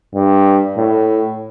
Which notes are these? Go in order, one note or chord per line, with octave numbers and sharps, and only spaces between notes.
G2
A2